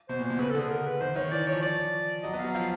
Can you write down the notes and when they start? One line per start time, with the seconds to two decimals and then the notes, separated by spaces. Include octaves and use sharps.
0.09 B2 C5
0.19 A#2
0.24 C5
0.30 B2
0.39 C#3 B4
0.50 A4
0.55 D3 G#4
0.71 A#4
0.86 B4
1.01 D#3 C5
1.16 D#3 C#5
1.31 E3 D5
1.47 F3 C#5
1.62 D5
2.23 F#3 D#5
2.33 B3
2.39 F5
2.44 F#3
2.55 F3 F5